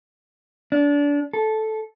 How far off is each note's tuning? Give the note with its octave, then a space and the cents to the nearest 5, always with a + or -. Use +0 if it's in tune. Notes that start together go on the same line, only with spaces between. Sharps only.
D4 -25
A4 -10